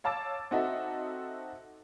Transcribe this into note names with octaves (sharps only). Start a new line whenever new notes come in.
C#5 F5 A5 D6 E6 A6
C4 D#4 F#4 A4 D#5 E5